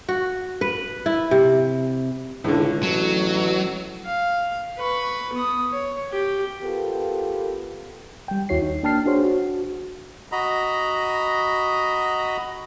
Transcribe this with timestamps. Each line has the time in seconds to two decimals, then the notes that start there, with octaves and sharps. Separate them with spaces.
0.09 F#4
0.61 B4
1.06 E4
1.31 C3
2.44 C#2 A2 D3
2.83 A1 F#3
4.05 F5
4.78 B4 C#6
5.33 B3 D#6
5.72 C#5
6.12 G4
6.63 B3 F4 G4 A4 A#4
8.28 G3 G5
8.49 D#2 E4 F#4 C#5 C7
8.62 D#4
8.83 A#3 D4 G5 A5 F6 C7
9.06 D4 F#4 G#4 C5 C#5
9.24 F#4
10.32 F#4 D#5 A#5 B5